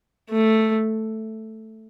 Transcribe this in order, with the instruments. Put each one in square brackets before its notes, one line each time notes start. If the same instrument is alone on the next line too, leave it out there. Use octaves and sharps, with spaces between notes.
[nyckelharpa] A3